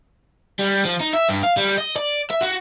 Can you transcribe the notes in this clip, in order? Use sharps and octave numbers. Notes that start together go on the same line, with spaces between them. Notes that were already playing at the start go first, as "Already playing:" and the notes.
G3
F3
D#4
E5
G2
F5
G3
D#5
D5
E5
F#4